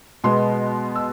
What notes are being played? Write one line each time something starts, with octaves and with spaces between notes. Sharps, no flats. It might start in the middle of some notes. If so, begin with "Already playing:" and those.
B2 G#3 B3 C6
E6